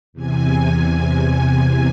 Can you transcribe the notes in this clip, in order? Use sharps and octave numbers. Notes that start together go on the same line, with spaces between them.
E2 C3 G#5